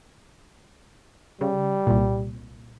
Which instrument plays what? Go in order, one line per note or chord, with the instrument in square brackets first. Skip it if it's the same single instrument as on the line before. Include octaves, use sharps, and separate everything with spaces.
[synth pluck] C#3 [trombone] G3
[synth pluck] C2 A#2